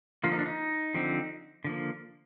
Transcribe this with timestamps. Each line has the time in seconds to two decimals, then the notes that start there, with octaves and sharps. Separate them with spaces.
0.24 D3 F3 A#3 F4
0.32 D#4
0.39 D4
0.46 D#4
0.94 D3 F3 C4
1.64 D3 F3 A#3